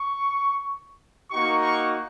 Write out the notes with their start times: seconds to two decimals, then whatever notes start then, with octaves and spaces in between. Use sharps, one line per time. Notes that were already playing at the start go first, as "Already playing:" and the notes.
Already playing: C#6
1.31 A#3 D#4 F#4 C#6
1.61 C#6